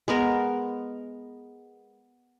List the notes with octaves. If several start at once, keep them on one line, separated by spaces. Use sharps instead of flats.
G#3 B3 A#4